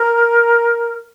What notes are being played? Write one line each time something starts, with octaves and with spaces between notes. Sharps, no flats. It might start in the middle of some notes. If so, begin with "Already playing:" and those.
Already playing: A#4